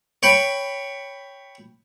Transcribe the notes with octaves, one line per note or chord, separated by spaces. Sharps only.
C#5 G5 B5